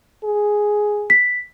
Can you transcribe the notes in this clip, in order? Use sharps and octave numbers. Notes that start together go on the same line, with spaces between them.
G#4
B6